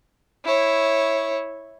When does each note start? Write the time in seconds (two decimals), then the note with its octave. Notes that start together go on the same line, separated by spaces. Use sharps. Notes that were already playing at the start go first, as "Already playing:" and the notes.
0.45 E4 C#5